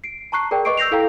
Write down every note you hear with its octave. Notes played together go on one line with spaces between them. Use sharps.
C7 D7
A5 A#5 C#6 F#6 C7
G#4 A#4 D5 G5
B4 D#5 C#6 D6 C7 D7
E6 G6 A#6 C7 F7
E4 A4 F5 G5 A#5